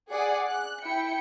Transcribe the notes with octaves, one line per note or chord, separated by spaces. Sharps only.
G#4 D5 F#5
F#6
E4 G5 C#7